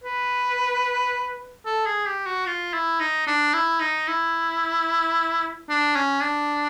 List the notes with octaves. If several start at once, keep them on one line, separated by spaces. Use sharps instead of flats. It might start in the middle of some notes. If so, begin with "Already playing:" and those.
B4
A4
G#4
G4
F#4
F4
E4
D#4
D4
E4
D#4
E4
D4
C#4
D4